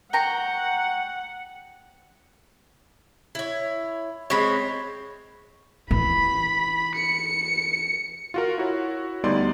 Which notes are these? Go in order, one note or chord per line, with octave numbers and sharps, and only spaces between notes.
F#5 G5 A#5 C#6
E4 C#5
G#3 C4 C#5 B5
E3 B5
C#7
F4 F#4 A#4
E4 F#4 C#5
D2 G3 B3 D#4 D5 C6